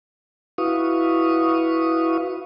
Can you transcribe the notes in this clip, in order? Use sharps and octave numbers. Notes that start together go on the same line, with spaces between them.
E4 F#4 B4 F5 C#6 D#6